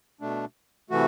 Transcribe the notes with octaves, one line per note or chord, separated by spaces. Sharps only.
B2 A3 D4
C3 E3 A3 F#4